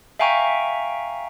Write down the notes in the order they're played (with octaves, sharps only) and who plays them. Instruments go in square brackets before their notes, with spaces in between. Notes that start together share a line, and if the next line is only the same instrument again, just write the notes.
[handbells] E5 F5 G5 G#5 A#5 C#6